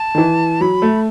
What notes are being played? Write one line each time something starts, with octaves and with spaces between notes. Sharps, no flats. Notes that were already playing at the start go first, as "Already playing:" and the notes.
Already playing: A5
D#3
E3
F#3 B5
A3